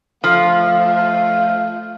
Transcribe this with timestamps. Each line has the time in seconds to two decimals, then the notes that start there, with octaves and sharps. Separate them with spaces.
0.24 F3 A3 F5